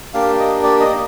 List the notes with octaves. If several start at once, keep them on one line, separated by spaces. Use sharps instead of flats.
A#3 D4 G4 F5
D#5
D5
D#5